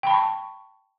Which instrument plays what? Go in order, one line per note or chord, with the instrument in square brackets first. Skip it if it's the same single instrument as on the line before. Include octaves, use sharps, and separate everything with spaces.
[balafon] G5
B5
A5
C#6